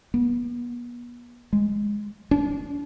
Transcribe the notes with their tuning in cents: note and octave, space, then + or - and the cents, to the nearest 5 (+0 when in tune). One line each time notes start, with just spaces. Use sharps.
B3 -35
G#3 -10
D4 -35